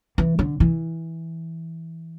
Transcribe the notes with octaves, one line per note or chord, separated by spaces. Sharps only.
E3
D3
E3